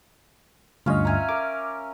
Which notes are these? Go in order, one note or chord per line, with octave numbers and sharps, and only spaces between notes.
D2 G2 C#4 F4 D#5
E5 G#5 A#5
A#4 D6